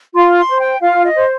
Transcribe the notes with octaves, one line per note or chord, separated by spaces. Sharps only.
F4 C6
C6
C5
G5
F4 F5
D#5
C5